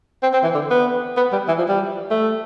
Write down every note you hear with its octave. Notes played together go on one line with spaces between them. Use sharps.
C4
C4
E3
D3
B3
B3
G3
E3
F3
G3
A3